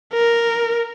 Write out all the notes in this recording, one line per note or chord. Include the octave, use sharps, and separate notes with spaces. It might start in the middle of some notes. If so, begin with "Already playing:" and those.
A#4